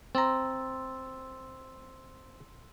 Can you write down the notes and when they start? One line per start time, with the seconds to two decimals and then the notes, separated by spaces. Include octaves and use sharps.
0.15 C4 A#5 C6 E6 A6